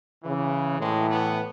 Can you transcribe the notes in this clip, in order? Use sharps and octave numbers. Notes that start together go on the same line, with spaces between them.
C#3 E3
A2 E3 G#3
B3